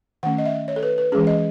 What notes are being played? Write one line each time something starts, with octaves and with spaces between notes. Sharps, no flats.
D#3 A3 C#4 F#5
D#5
E5
C#5
A4
B4
B4
E3 G#3 C#4 G#4
D#5